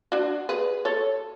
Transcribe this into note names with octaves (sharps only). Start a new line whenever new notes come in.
D4 F#4
G#4 B4
A4 C#5